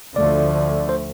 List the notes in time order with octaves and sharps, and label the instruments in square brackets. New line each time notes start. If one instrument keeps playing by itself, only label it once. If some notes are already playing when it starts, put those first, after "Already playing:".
[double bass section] D2 D3 F3 A3 [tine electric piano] D5
[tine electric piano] C5